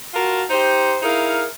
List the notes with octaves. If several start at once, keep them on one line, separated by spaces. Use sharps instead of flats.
F4 F#4 A#4 F5 A5
D#4 G4 C5
D#4 E4 G#4 A#4 F5